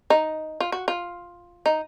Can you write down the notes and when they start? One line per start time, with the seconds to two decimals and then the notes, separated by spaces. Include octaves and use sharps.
0.10 D#4
0.60 F4
0.72 F#4
0.88 F4
1.66 D#4